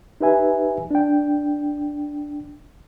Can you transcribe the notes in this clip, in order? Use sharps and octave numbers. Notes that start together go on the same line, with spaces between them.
D#4 G4 B4 E5 G#5
D4 G5